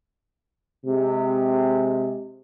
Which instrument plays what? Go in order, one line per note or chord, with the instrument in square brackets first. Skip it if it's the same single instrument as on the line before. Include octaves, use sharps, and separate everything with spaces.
[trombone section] C3 G#3